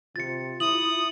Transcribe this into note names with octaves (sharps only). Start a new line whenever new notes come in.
C3 F4 A6 C#7
E4 D#6 F#7